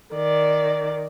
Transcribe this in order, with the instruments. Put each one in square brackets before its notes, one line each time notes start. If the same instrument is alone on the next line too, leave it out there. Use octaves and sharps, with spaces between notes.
[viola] D#3 D5